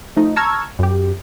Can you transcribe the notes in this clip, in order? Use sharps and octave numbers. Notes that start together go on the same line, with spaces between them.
F3 A3 D#4
A5 A#5 C#6 E6 F6 G#6
F#2 G4